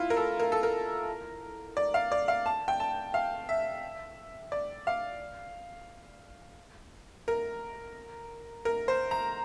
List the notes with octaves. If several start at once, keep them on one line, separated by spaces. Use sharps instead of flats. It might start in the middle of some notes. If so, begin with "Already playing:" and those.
Already playing: E4 F4
A#4
A4
A#4
A4
A#4
D5
F5
D5
F5
A5
G5
A5
F5
E5
D5
F5
A#4
A#4
C5
A#5